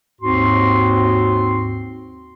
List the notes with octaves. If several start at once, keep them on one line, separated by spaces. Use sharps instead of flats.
D#2 G#2 C4 F#4 C6